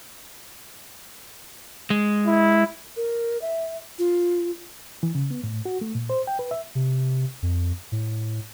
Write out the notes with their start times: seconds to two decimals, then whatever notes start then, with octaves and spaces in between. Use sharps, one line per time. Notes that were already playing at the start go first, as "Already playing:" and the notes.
1.90 G#3
2.27 E4
2.97 A#4
3.42 E5
3.99 F4
5.03 E3
5.15 C#3
5.31 B3
5.44 A2
5.65 F#4
5.81 A3
5.95 A#2
6.10 C5
6.27 G5
6.39 B4
6.51 E5
6.75 C3
7.42 F2
7.92 A2